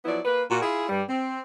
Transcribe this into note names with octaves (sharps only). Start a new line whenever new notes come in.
F3 F#3 B3 E4 D5
A#3 B4
A#2 F#4
E4 F4 G#4
G2 G3
C4